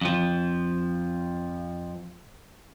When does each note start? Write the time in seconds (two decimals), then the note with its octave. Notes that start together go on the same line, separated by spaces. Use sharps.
0.01 F2 F3